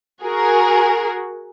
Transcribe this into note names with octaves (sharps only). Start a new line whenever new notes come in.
F#4 G#4 A#4